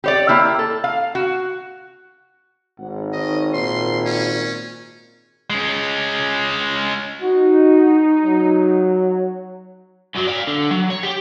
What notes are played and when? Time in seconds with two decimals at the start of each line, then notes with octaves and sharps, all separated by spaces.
0.04 G4 C#5 D5
0.29 A#3 E4 G4
0.59 A4
0.84 F5
1.15 F#4
2.79 G#1 G#2 F#5
3.13 D#3 C#5 D#5
3.54 A#2 C6
4.06 C#4
5.50 G#3 C#4
7.22 D#4 F#4
8.25 F#3
10.15 F#2 F#3
10.27 D5 F5
10.47 D3
10.71 F#3
10.90 C#5
11.03 G4